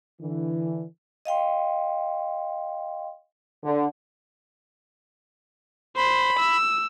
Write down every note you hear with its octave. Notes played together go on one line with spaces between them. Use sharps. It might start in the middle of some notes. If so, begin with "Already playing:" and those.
D3 E3
D#5 F5 G5 C6
D3
C5 B5
E6